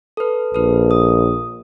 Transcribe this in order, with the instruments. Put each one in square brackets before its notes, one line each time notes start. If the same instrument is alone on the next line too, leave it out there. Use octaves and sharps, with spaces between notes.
[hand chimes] A4 B4
[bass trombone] A#1 [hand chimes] A4 B4
[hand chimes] D#6